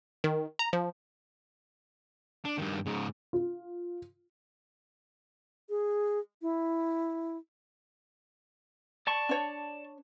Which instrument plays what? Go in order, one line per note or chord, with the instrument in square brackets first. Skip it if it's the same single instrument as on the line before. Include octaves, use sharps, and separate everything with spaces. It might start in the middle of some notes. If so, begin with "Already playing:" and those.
[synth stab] D#3
A#5
F3
[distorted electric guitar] D4
G2 D#3
G#2 C#3
[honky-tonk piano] F4
[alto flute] G#4
E4
[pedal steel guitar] D5 A5 C#6
[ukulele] D4 C#5